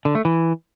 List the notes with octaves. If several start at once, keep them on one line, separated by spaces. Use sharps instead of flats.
D3
A3
E3